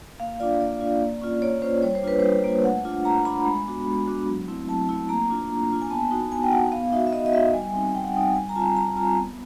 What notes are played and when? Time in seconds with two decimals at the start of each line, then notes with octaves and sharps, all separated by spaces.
0.20 A#3 F5
0.40 D4 F4 D5
0.60 A#3 D5
0.81 D4 F4
1.01 A#3
1.21 C#4 F4
1.42 A#3 C#5
1.62 C#4 F4 C5
1.82 G3 C#5
1.95 C5
2.03 A#3 D4 F4 B4
2.19 G3 C5
2.44 A#3 D4 F4
2.64 A3 F#5
2.85 D4 F4
3.05 A3 A#5
3.25 D4 F4 B5
3.46 G#3
3.66 B3 D4 F#4
3.87 G#3
4.07 B3 D4 F#4
4.27 F#3
4.48 A3 C4 E4
4.69 F#3 A5
4.89 A3 C4 E4
5.09 A#3 A#5
5.30 D4 F4
5.50 A#3
5.70 D4 F4
5.82 G#5
5.90 B3 A5
6.11 D#4 F#4
6.32 B3 G#5
6.43 G5
6.51 D#4 F#4 F#5
6.72 B3 F5
6.92 D#4 F#4 E5
7.07 E5
7.13 B3 D#5
7.26 D#5
7.33 D#4 F#4 E5
7.54 G3 G#5
7.74 C4 D#4
7.95 G3 G5
8.04 F#5
8.14 C4 D#4 G5
8.35 G3 G#5
8.49 A#5
8.56 C4 F4 A5
8.76 G3 A#5
8.97 C4 F4 A#5
9.17 B3